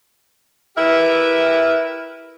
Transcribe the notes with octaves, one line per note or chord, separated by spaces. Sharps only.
E4 G4 A#4 B4 E5